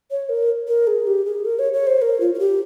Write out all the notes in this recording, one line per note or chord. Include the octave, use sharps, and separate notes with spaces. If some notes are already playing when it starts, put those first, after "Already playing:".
C#5
A#4
A#4
G#4
G4
G#4
A#4
C#5
C#5
C5
A#4
F4
F4
G4